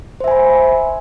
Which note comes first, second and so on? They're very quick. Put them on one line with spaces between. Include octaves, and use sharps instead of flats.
C5 E5 G#5 B5